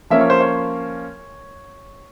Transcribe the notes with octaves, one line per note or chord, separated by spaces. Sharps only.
F3 A#3 C#4 E5
C#5
C5
C#5